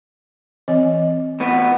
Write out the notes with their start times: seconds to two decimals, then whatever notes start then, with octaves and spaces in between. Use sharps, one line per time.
0.68 E3 C4 D#5
1.40 A2 B3